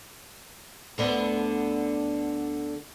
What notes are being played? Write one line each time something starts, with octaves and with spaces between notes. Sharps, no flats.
D2 D3 B3